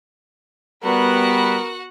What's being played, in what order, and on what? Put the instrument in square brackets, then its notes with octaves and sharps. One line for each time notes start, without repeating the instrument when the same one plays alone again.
[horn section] G3 B4 [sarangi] B3 [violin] F#4 F#5 [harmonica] A#4